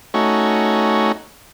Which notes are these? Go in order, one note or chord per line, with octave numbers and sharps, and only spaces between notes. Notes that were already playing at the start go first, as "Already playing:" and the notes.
A3 C#4 D#4 F#4